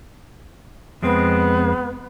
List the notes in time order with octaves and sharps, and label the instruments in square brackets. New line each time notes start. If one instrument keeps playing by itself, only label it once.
[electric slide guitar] F2 G#3 C4 [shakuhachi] B3